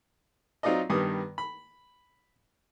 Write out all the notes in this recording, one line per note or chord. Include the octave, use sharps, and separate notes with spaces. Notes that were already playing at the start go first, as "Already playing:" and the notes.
F#3 C4 D#4 F4 D5 D#5
G2 D#3 G3 B3 D#6
B5